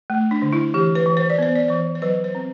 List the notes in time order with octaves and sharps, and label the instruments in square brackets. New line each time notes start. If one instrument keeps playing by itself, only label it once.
[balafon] A3
D4
D3
E4
E3 G4
B4
E3
C5
D5
B3 C5
D5
E3 C5
C5
F#3 B4
C5
C4